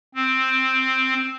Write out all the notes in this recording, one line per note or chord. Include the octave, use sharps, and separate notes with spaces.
C4